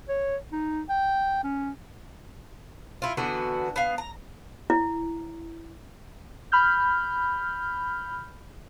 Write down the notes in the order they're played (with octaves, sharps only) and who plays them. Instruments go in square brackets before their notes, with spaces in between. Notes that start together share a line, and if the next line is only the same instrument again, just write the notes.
[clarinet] C#5
D#4
G5
C#4
[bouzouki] E4 F4
D3 E3 B3 F#4
B3 F5
A#5
[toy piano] E4
[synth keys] B5 F6 G6